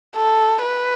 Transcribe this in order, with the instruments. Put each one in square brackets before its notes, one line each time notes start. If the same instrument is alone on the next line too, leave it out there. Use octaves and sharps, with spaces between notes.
[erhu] A4
B4